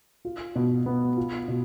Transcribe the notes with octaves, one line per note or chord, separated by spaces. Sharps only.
F4
B2
B3
F4
B2